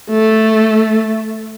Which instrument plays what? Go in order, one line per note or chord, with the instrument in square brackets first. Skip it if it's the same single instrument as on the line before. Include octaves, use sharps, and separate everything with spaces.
[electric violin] A3